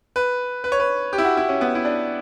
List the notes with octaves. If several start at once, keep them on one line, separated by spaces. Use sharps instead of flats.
B4
B4
C#5
B4
G4
E4
F#4
E4
C#4
B3
E4
D4